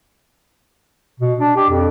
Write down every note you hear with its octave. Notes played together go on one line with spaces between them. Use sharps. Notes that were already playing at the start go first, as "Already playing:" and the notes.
B2
D4
G4
F2